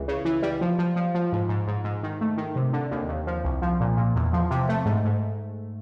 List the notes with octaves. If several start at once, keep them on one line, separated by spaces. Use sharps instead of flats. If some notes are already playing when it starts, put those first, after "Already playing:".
Already playing: C#2 E3
C#3
E3
G3
F3
F3
F3
F3
G#2
G#2
G#2
G#2
D#3
A3
D#3
C3
D3
D#2
D#2
F3
C2
F3
A#2
A#2
E2
F3
C3
A3
G#2
G#2